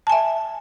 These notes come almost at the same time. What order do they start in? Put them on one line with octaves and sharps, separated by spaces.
A5 G#5 E5